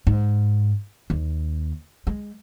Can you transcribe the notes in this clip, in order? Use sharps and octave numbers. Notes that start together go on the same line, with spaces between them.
G#2
D#2
G#3